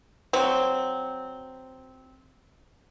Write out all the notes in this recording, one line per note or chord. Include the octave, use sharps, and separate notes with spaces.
F#3 C4